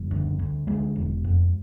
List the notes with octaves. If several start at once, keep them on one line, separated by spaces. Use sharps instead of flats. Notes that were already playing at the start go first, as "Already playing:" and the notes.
Already playing: F#1 G3
D2
D2
D2 G#3
E1
F2